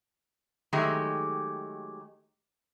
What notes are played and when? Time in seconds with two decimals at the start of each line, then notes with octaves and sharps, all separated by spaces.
0.73 D#3 F#3 G#3 A3 G4